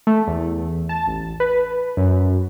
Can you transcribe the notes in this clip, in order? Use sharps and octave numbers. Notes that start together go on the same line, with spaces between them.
A3
E2
A5
A1
B4
F#2